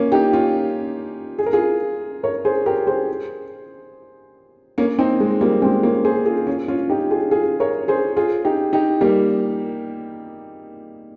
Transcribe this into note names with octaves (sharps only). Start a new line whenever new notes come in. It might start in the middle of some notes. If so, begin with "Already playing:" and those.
Already playing: A#3 C#4
D#4 G4
C#4 F4
G#4
A#4
F4 G#4
A#4 C#5
G#4 C5
G4 A#4
G#4 C5
A#3 C#4
C4 D#4
G#3
G3 A#3
G#3 C4
A#3 C#4
G#4 C5
F4 G#4
C#4 F4
C#4 F4
D#4 G4
F4 G#4
F4 G#4
A#4 C#5
G#4 C5
F4 G#4
D#4 G4
D#4 G4
G3 A#3